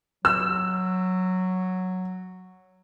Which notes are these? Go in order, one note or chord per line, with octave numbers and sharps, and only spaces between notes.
F#3 E6